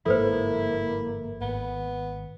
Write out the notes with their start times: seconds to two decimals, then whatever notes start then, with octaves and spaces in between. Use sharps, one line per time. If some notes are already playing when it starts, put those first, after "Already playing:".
0.06 G1 G#2 F3 A#3 E4 A4 B4 C5
1.41 G#1 B3